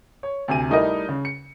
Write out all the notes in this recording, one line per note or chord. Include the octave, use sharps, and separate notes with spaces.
C#5
D2 C3 G#5 D#7
G3 A3 D#4 E4 A#4 D#5
C#3
C#7